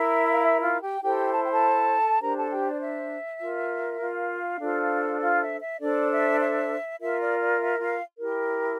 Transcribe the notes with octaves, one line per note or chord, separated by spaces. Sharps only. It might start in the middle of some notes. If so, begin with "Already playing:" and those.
Already playing: E4 A#4 E5
F5
E5
F4 F5
G4 G5
E4 G4 A4 C5 G5
A5
G5
A4 A5
D4 G4 A#4 C5 A#5
A4 A5
G4 G5
D5
E5
F4 A#4
F4 F5
D4 F4 A4 C5
F4 F5
E5
E5
D4 A4 C5 D5
E5
E5
F4 A#4 E5
D5
D5
E5
F4 F5
E4 G4 A#4